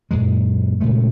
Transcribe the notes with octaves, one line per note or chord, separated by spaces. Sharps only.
F#2 A#2 F#3 G#3
A#2 C#3 G#3 A3